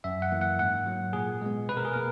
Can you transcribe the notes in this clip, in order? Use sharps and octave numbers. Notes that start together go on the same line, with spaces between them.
F#2 E5
F#5
E3 A#3
F#5
G#2 F#5
F#3 A#3
A#2 G#4
G#3 B3
B2 B4
A#4
G#4
A#3 A#4